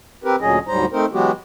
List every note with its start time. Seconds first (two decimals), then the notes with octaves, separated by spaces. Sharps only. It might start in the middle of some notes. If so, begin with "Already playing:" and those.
0.24 C4 G4 A#4 B4
0.41 D2 A#2 F#3 C#4 G#4 D#5
0.68 D2 G#2 F#3 G3 C5 A#5
0.92 A3 C4 D#4 A#4 C5
1.13 E3 F#3 G#3 B3 F#4 G4